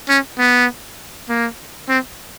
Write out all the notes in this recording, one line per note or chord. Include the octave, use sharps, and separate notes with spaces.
C#4
B3
A#3
C4